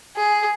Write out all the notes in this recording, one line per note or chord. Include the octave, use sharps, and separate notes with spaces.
G#4